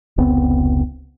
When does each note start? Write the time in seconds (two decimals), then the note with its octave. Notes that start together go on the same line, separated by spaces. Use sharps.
0.18 F1 C#2 B3 C4